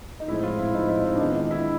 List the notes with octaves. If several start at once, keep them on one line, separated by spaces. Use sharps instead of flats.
D#4
A2 F3 G#3 C4 E4
F4
E4
A2 F3 G#3 C4 D#4
E4
D#4
D4
D#3 G#3 B3 D#4
D#4
E4